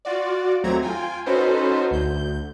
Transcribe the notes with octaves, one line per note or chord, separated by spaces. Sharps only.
F4 F#4 D5
D#2 F#3 A3 C4 A#5 G#6
F4 G5 G#5
C#4 D#4 F#4 A4 B4 C5
D2 G6